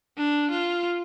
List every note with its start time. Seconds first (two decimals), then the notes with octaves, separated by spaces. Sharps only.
0.18 D4
0.51 F4